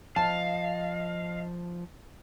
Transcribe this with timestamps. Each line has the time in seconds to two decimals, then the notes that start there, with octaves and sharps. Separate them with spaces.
0.16 F3 D#5 F5 A5